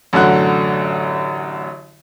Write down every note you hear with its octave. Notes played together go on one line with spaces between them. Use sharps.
A1 F#2 D3 F#4 F#6